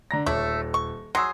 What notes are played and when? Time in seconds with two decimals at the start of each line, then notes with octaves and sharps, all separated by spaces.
0.11 D3 A#5 A#6
0.26 D#1 A3 C#5 D5 E5 E6
0.74 C#6
1.15 F#3 G#4 C6 E6